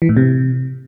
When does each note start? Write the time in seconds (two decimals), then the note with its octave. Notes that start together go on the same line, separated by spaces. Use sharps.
0.02 E3
0.09 A2
0.17 C3